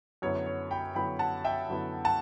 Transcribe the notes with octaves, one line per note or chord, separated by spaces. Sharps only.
F#2 D3 F#3 B3 E4 C#5
C#5
G5 B5
F#2 D3 F#3 B3 E4 G5 B5
F#5 A5
E5 G5
F#2 D3 F#3 B3 E4
F#5 A5